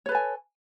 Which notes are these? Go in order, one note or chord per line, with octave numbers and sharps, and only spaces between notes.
A4 B4 C#5 G#5